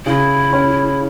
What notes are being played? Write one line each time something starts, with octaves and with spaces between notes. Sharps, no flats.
C#3 E4
C#4